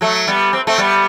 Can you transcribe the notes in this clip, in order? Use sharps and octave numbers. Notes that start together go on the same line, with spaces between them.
F#3 A3
G3 B3
C4
A3 C4
G3 B3